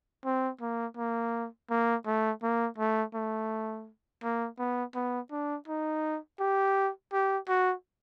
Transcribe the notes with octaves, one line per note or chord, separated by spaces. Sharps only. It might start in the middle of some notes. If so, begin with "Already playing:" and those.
C4
A#3
A#3
A#3
A3
A#3
A3
A3
A#3
B3
B3
D4
D#4
G4
G4
F#4